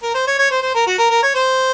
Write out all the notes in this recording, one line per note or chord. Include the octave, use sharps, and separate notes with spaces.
A#4
C5
C#5
C#5
C5
C5
A#4
F#4
A#4
A#4
C#5
C5